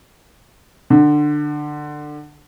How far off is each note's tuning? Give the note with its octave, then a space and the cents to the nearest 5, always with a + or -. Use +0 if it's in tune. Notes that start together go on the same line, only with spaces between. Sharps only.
D3 +20